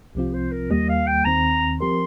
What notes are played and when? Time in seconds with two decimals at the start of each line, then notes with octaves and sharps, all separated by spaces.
0.15 C2 C3 F3 C4 F4 G4
0.34 C5
0.52 A#4
0.70 D#2 D#3 G3 A#3 G4 D#5
0.89 F5
1.07 G5
1.25 D#2 D#3 C4 A#5
1.80 F3 C4 G4 A#4 C6